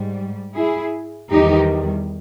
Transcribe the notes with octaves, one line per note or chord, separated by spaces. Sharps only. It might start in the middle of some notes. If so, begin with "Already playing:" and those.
Already playing: G#2 G3
E4 G#4
E2 D#3 G3 D#4 G4